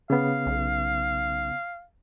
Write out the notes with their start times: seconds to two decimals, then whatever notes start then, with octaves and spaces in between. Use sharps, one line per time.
0.10 C#3 B3 F5
0.46 B1